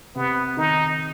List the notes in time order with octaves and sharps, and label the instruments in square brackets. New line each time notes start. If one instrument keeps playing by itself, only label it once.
[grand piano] C3 [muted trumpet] B3
[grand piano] D#3 [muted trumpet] D#4